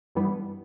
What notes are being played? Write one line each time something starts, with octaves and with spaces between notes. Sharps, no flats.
G2 E3 G3 B3